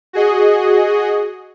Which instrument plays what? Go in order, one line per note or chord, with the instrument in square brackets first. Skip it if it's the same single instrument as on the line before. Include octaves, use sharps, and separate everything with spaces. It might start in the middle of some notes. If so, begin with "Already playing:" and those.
[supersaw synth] F#4 G#4 D#5